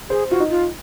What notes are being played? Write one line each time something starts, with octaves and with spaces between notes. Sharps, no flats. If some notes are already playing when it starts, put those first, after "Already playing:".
G#4 C5
F4 F#4
D#4
F4